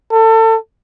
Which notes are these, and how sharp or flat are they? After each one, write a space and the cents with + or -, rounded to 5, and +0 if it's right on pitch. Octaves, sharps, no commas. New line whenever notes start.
A4 +30